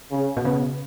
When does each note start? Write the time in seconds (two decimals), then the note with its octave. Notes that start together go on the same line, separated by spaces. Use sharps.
0.11 C#3
0.37 B2
0.45 C#3 B3